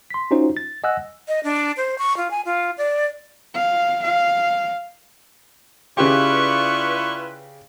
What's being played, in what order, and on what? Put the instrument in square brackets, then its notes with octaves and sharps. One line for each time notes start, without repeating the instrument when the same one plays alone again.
[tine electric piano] C6 B6
C#4 D#4 F4 F#4 C5
A6
D#5 F#5 G#5 E6 F#6 A#6
[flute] D#5
D4
C5
C#6
F4
G#5
F4
D5
[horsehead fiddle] F5
F5
[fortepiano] C#3 G4 [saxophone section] E4 F4 B4 [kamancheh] D5 C#6